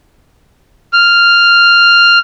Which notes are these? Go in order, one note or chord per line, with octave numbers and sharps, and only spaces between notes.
F6